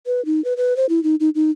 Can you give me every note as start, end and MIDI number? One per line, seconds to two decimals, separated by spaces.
0.06 0.24 71
0.25 0.43 63
0.44 0.53 71
0.57 0.76 71
0.77 0.86 72
0.89 1.02 64
1.03 1.15 63
1.20 1.30 63
1.35 1.50 63